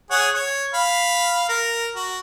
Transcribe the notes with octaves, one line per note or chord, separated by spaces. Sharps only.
G#4 C#5 F#5
C#5
F5 B5
A#4
F#4